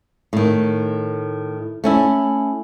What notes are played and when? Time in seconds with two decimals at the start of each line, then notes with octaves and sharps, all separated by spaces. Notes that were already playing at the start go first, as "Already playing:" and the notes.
0.33 A2 D#3
1.84 A3 C#4 E4